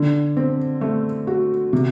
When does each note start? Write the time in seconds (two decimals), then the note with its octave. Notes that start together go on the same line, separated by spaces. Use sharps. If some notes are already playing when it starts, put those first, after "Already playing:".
Already playing: D3
0.37 C4
0.81 A3
1.27 F#4
1.73 C3